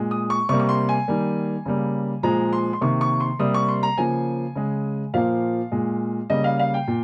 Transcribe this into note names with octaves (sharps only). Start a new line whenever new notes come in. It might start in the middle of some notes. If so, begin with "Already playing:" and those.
Already playing: A#2 G#3
D#6
C#6
C3 G3 A#3 C#6
C#6
C6
G#5
D#3 G3 A#3
C#3 G3 A#3
A#2 F3 G#3 A#5
C6
C6
C3 D#3 A#3 C#6
C#6
C6
C3 G3 A#3 D#6
C#6
C6
A#5
C#3 F3 A#3 G#5
C#3 G#3
A#2 F3 A#3 F5
A#2 G#3
C#3 G3 A#3 D#5
F5
F5
G5
A#2